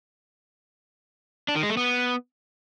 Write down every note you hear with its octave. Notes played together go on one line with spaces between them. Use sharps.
D4
D#3
G#3
A3
B3